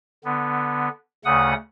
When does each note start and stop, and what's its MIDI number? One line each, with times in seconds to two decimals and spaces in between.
0.24 0.89 50
0.24 0.89 59
1.25 1.53 38
1.25 1.53 49
1.25 1.53 57
1.25 1.53 78
1.25 1.53 87